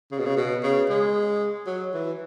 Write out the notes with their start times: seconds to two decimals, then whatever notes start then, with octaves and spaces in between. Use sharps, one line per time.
0.11 C#3
0.19 B2
0.25 C#3
0.37 B2
0.63 C#3
0.90 G#3
1.67 F#3
1.94 E3